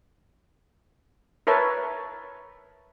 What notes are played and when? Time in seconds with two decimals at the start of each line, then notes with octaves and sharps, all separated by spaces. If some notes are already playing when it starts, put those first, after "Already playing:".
1.47 A#4 B4 C#5 E5 A5